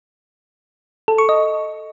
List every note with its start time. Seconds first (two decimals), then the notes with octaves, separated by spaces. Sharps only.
1.08 A4
1.18 C#6
1.29 D#5